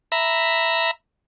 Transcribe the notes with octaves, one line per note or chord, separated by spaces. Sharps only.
E5 A#5 B5